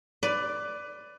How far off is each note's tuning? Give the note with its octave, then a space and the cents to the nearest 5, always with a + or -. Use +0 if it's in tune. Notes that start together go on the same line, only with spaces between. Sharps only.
B4 +20 D5 +0